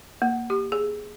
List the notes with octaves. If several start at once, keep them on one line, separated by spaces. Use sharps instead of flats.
A#3
G4
G#4